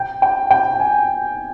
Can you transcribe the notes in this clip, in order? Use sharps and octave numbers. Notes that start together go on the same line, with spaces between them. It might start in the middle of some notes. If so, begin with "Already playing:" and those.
Already playing: G5
G5
G5
G#5